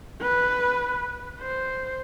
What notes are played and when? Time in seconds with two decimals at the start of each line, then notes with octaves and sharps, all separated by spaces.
0.21 B4
1.41 C5